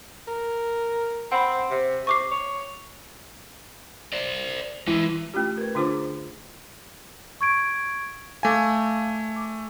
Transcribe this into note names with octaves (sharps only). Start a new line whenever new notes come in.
A#4
C4 F#5 B5
C3
C3 C#6 D6 C7
C#5
C5 D5
E3 G#3 B4
A3 C#4 F4 G4
A#4 B4
D3 D4 F4 G#4 C5 D6
C#6 G#6 D7
A3 F5 G#5 D6
D6